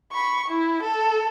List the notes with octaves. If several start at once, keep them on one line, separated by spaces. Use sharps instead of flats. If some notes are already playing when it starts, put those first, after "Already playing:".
B5 C#6
E4
A4